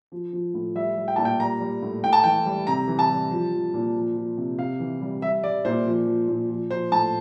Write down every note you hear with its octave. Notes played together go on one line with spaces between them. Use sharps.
F3
F3
A2
G3 E5
G3
G5
A#2 A5
G5
G3 A#5
G3
A2
A2 G5
A5
E3 G5
G3
C3 A#5
E3
A5
G3
F3
F3
A#2
F3
F3
C3
C3 F5
E3
G3
G3 E5
G3 D5
A#2 C5
F3
F3
A#2
F3
F3 C5
A2 A5